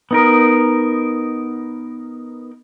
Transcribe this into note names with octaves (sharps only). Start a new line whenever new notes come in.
B3 D#4 A#4